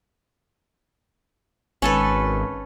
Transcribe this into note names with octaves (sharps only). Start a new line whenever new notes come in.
G#1 C#4 A4 B4